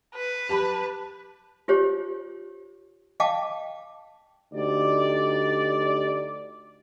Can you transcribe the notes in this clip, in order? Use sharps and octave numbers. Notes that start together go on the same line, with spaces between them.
B4
G4 A5 B5
F4 G4 C5 C#5
D#5 F5 G5 A5 D6
D2 D#4 G4 D5